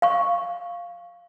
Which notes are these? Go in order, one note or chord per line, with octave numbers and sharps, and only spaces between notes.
F5 C#6